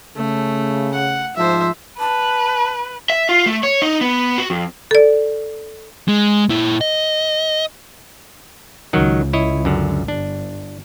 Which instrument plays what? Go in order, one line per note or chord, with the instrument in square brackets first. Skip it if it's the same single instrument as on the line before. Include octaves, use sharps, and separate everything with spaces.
[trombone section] C#3 [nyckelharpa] A3
[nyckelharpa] F#5
[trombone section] G#2 F3 [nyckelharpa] C5 E5
[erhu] B4 [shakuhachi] A5
[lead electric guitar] E5
F4
A3
C#5
D#4
B3
F#4
F2
[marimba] A4 D5
[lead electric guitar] G#3
A#2 E4
D#5
[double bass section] C#2 [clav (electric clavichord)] D#3 F#3
[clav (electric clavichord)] E4 C#5 D#5
F#2 D3
[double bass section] G1 [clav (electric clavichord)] D4